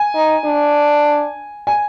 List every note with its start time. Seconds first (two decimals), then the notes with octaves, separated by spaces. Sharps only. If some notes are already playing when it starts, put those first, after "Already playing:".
Already playing: G#5
0.15 D#4
0.45 D4
1.67 G#5